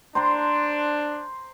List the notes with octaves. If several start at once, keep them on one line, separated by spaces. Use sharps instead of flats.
D4 C5 A#5 C6